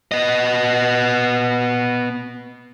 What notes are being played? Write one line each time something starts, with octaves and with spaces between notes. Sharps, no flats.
B3 D#5